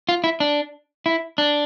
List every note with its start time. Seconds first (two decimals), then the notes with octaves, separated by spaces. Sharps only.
0.09 F4
0.24 E4
0.40 D4
1.06 E4
1.38 D4